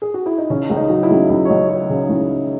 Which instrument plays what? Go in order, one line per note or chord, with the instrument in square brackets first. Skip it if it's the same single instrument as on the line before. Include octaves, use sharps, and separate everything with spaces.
[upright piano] G#4
F#4
E4
D#4
C#3 C#4
C#2
D#4
F#3
E4
C#2
C#2 E4
C#5
C#2 D#5
F#3 C#5
C#3 G#4
D#4
C#2 E4
F#3